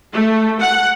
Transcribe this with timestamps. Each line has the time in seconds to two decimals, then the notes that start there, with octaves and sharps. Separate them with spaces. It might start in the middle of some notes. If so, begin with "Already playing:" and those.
0.12 A3
0.60 F#5